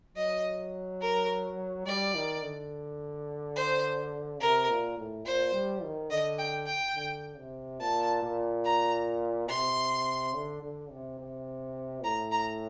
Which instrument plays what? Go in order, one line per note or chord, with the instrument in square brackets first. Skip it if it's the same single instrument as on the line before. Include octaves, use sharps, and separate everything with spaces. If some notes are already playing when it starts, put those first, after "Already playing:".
[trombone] F#3 [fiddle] D#5
[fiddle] A#4
[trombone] G3 [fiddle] D5
[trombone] D#3
D3
[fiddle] C5
[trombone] C3 [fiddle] A#4
[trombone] A#2
A2
[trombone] A#2 [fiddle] C5
[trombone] G3
D#3
[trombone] D3 [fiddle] D#5
[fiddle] G5
G5
[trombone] D3
C3
[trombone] A#2 [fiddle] A5
[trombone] A#2
[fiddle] A#5
[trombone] C3 [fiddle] C6
[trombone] D3
D3
C3
C3
[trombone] A2 [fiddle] A#5
[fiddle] A#5